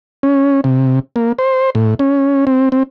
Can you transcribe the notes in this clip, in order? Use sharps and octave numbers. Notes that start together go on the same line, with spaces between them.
C#4
C3
A#3
C5
A2
C#4
C4
C4